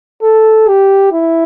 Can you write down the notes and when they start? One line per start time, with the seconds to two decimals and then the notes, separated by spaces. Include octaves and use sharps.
0.22 A4
0.68 G4
1.13 E4